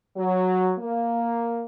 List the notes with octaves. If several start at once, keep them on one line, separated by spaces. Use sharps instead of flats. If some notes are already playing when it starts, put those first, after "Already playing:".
F#3
A#3